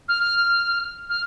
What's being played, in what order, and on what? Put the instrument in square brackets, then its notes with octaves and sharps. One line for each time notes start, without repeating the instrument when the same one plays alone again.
[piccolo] F6
F6